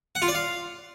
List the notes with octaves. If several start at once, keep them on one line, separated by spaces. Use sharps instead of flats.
F#5
F4
D5
F5